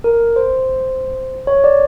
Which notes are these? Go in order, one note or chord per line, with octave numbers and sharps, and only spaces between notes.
A#4
C5
C#5
D5